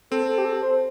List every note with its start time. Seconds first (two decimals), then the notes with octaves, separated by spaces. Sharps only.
0.11 C4 A4
0.28 A4
0.38 G4
0.45 A4
0.62 C5